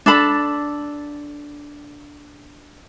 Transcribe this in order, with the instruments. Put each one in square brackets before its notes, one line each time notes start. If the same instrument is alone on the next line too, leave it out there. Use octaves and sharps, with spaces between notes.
[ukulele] D4 A4 B5